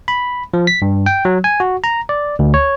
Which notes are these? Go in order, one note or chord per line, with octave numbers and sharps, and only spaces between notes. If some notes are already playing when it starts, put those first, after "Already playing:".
B5
F3
B6
G2
G5
F#3
G#5
F#4
A#5
D5
D2
C#5